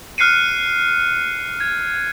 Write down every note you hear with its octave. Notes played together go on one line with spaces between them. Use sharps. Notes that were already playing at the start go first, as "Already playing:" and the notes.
F6 F#6 C7 C#7 D#7
G#6